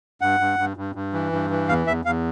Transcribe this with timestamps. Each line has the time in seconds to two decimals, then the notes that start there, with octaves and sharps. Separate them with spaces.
0.21 G2 F#5
0.40 G2
0.59 G2
0.77 G2
0.95 G2
1.13 E3
1.32 G2
1.50 E3
1.68 E2 F5
1.87 E2 E5
2.05 E2 F5